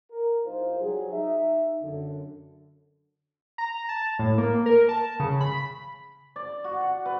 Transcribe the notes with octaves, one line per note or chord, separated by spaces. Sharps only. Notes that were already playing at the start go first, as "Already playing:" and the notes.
A#4
C2 D#4 F4 C5
F#3 G3 G#4
D#4 E5
F#2 D3
A#5
A5
A2
A#3
A#4
A5
C#3
B5
D5
F#4
F#5
B4